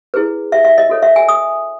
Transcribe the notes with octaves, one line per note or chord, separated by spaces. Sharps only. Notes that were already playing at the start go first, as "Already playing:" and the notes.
E4 G#4 B4
E5
E5
D#5
F#4 A4 C#5
E5
G#5
D#6